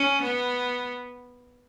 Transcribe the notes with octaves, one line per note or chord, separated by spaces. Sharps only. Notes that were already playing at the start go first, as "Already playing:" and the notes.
Already playing: C#4
B3